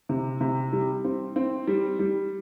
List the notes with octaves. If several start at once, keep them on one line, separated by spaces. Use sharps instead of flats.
C3
C3
G3
C4
C4
G3
G3